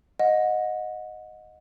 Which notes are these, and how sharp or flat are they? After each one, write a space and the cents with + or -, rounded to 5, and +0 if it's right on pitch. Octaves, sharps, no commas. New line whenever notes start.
D#5 +0 F#5 -25